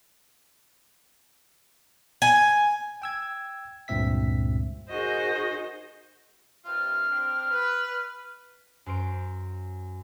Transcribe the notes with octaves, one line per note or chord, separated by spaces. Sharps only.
G#5
G5 E6 G#6
C#2 G2 A#2 C4 E5 B6
D#4 F#4 G#4 A#4 C5 D#5
G2 C3 F4 F6
C4 D4
B4
F#2 C5 D7